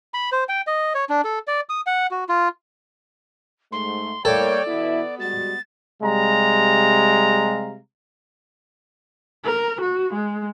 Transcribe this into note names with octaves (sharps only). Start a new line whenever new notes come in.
B5
C5
G5
D#5
C#5
D4
A4
D5
D#6
F#5
F#4
F4
G#2 A3 C6
A2 G3 A#3 A4 C#5 D5 G5
B2 E3 B3 E4
G3 G#3 F#4 A6
C3 G3 G#3 F5 A#5
A#4
F#4
G#3